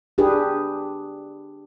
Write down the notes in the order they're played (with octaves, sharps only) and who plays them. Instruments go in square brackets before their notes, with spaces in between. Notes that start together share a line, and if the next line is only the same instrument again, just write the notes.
[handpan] D4 G4 G#4 B4